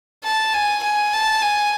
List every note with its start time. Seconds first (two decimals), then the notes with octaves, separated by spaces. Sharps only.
0.25 A5
0.54 G#5
0.83 G#5
1.13 A5
1.41 G#5